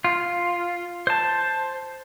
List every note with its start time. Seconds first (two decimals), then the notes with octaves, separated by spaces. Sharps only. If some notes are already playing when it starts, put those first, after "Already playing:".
0.04 F4
1.07 C5 A5